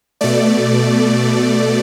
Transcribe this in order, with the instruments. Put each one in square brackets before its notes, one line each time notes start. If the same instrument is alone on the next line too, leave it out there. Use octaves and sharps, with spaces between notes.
[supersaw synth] B2 A3 D5